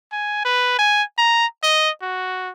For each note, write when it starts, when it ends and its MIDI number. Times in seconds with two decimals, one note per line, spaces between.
0.12 0.40 80
0.45 0.75 71
0.79 1.03 80
1.18 1.46 82
1.63 1.90 75
2.02 2.51 66